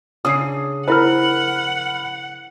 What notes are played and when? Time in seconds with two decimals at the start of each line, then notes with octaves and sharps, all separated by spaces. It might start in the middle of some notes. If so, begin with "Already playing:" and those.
0.25 C#3 D4 G#4 D#6 C7
0.88 E4 A#4 C5 F#5 B5 F6